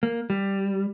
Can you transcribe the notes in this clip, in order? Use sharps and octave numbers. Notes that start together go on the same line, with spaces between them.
A#3
G3